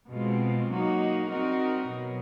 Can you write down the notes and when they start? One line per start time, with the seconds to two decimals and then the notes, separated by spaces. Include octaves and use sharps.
0.10 B2 G#3 C4 F4
0.69 F#3 A#3 D#4 F#4
1.28 G3 C4 D#4 F#4 A#4
1.88 B2 F#3